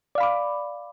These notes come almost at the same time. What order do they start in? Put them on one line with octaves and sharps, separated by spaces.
D5 F5 B5 D6